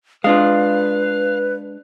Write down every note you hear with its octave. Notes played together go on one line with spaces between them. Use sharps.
G#3 D4 F4 B4 F5